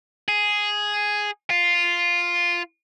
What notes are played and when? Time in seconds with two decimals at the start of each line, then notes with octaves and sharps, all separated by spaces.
0.28 G#4
1.50 F4